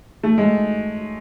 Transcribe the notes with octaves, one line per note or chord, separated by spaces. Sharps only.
A3
G#3